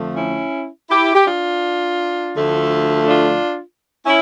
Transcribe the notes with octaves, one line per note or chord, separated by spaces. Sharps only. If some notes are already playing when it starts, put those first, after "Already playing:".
Already playing: F2 D3 F3 A3
C#4 E4
E4 G4
G4
D4 F4
D2 D3 F3 A3
D4 F4
C#4 E4